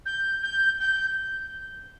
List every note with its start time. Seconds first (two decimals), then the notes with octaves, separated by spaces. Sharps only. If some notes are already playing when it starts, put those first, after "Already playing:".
0.06 G6
0.43 G6
0.80 G6